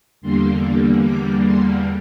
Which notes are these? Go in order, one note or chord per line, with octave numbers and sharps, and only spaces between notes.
E2 D3 G3 A#3 C6
D6
C6